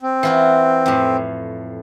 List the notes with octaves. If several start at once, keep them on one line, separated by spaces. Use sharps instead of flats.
C4
E3 F4 F#4
F2 A2